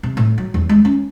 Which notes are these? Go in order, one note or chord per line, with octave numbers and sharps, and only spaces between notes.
C3
A2
F#3
E2
G#3
C#4